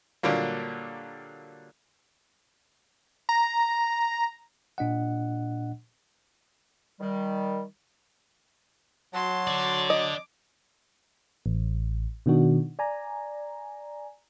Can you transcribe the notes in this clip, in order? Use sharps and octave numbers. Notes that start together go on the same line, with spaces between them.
A#2 D3 F#3 G3 A#3
A#5
A#2 D4 D#5 F#5
D#3 G3
F#3 A5 C6
D3 D5
D#5 D6
A1
B2 D#3 D4 F#4
D5 G#5 A#5